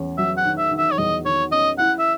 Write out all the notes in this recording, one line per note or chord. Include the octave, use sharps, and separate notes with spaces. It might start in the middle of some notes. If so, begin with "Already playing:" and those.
Already playing: E2 C#4
F#3 E5
F#5
D#3
E5
D#3
E5
C#5
E2 D#5
D#3 C#5
C#4 D#5
E4 F#5
E5